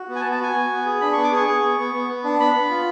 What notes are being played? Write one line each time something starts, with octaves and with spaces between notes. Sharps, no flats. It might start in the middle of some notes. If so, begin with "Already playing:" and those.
Already playing: F#4
B3
G#5
A5
B3
A5
F#4 G#5
B3
B3
G#4
D4 B5
C#6
B3
D6
G#4 C#6
G#4
B3
B3
B3
B3
D4
B3 B5
B3
F4